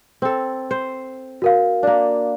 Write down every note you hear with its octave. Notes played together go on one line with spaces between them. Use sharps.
C4 A4
C5
F#4 A#4 F5
A#3 D4